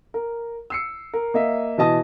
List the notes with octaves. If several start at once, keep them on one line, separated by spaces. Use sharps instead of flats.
A#4
E6 C7 C#7
A#4
A#3 D#5 E5
B2 E3 D#5 A5 D#6 A#6